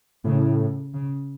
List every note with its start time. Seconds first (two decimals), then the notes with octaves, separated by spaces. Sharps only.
0.24 A2 C#3
0.94 C#3